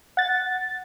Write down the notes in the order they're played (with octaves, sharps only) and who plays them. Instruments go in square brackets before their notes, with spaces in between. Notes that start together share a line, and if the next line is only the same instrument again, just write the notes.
[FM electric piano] F#5 A6